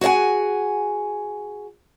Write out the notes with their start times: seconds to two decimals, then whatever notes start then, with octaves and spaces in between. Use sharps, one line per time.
0.01 F#4 G#4 D5 F#5 G#5